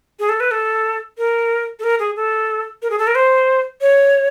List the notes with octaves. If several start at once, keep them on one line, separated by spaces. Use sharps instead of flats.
G#4
A4
B4
A4
A#4
A4
A#4
G#4
A4
A#4
G#4
A4
A#4
C5
C#5